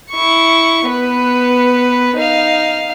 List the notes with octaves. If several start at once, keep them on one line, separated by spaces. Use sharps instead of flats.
E4 C#6
B3 B4
D#4 F5